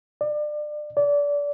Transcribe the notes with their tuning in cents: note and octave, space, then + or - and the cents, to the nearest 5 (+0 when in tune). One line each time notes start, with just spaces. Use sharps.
D5 +30
D5 -25